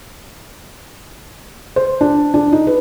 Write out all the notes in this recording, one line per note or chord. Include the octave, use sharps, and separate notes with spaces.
C5
D4
D4
D#4
B4